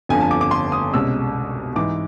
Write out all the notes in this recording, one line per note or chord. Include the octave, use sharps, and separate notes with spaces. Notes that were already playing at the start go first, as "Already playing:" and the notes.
G1 F2 D3 F3 G#5
A5
D6
D6
C6
D#6
C2 B2 G#3 C#4 E6
G#2 E3 G#3 D6